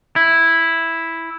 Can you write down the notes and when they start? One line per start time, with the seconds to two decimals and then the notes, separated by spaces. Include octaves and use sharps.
0.16 E4